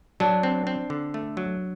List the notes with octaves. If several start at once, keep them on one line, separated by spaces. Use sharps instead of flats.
F#3 D4
C4
C4
D3
A3
F#3